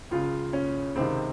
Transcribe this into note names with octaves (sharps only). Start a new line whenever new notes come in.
C#2 C#3 F4
C#4
C#2 C3 D#3 C4